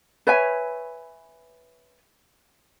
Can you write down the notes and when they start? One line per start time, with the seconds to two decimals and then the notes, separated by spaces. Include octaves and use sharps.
0.27 B4 C#5 E5 G#5